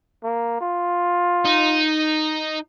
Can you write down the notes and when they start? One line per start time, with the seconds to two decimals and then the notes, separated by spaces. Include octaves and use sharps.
0.24 A#3
0.61 F4
1.45 D#4